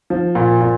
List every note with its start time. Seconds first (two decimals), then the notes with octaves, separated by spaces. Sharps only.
0.10 F3
0.35 A#2
0.61 A#2